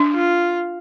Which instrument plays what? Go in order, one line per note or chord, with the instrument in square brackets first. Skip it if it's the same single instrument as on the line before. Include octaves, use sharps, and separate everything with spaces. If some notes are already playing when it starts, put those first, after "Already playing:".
Already playing: [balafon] D4
[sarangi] F4